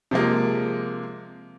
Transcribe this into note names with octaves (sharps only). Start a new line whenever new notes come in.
C3 F3 G#3 A#3